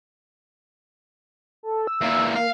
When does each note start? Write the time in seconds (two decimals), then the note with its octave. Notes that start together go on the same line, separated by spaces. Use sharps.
1.63 A4
1.87 E6
2.01 E2 A#3
2.35 A#3 F5